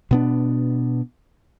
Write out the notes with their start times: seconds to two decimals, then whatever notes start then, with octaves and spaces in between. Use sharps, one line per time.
0.11 B2 B3 D4